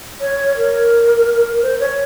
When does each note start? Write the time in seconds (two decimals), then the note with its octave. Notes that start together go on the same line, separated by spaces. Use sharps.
0.21 C#5
0.57 A#4
1.62 C5
1.80 C#5